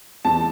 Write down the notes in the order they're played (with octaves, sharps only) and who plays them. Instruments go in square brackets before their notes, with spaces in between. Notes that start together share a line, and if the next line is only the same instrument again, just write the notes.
[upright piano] E2 A5